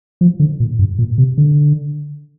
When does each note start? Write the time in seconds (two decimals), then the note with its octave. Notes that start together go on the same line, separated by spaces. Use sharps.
0.21 F3
0.40 D3
0.60 A#2
0.79 G2
0.99 A#2
1.18 C3
1.38 D3